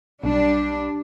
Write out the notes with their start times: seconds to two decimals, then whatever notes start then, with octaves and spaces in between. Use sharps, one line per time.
0.24 B1 G3 D4